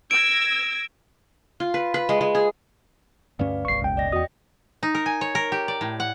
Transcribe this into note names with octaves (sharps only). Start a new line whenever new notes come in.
E6 G#6 A#6 D7
F4
B4
B4
G#3
G#3
G#4
D2 G2 C#4 B4 D5 F5
F#1 B1 C#6 C7
C#2 C#4 G5
D5 D#5 A#6
E2 F#4 D#5 G5 D#6
D#4
A#4
G#5
C#5
A#4
G4
D5
A2
F#5